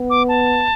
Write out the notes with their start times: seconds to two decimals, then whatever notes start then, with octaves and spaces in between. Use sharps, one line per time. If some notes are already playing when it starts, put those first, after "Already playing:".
Already playing: B3
0.10 D6
0.29 A5